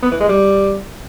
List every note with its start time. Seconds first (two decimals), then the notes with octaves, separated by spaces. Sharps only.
0.03 B3
0.12 E3
0.20 G#3
0.29 G3